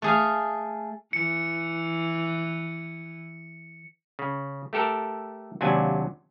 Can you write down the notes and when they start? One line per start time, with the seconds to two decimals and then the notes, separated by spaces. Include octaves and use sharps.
0.02 A3 G#4 F5
1.13 E3 C#7
4.19 C#3
4.73 A3 G4 A4 A#4
5.61 D#2 C3 F#3 D4 G#5